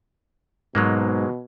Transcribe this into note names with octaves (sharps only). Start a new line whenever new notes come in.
G#2 B2 F#3 G#3 A#3